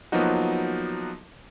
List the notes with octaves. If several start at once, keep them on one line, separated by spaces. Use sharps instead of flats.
F3 F#3 A#3 B3 D#4 F#4